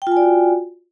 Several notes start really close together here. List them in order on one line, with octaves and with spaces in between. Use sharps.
G5 F4 G#5 D5 F#4